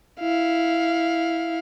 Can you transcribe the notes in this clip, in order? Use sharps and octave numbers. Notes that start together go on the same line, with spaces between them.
E4 F5